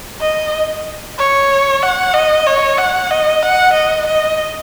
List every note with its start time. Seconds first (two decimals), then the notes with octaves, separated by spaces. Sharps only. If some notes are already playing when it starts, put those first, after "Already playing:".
0.21 D#5
1.19 C#5
1.83 F#5
2.14 D#5
2.47 C#5
2.78 F#5
3.11 D#5
3.42 F#5
3.74 D#5
4.07 D#5